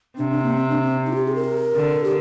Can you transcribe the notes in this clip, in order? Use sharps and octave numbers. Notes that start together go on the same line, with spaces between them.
C3 D4
D4
A#3
C4
D4
C4
D#4
F4
G4
G#4
A#4
D3
G4